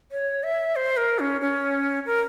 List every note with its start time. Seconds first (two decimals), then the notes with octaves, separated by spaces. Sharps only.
0.12 C#5
0.43 E5
0.76 C5
0.97 A#4
1.19 C#4
1.41 C#4
2.06 A#4